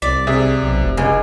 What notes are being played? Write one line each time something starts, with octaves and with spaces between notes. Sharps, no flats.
C2 D5 B6
C3 G#4 E5
B1
F1
C#2 G#3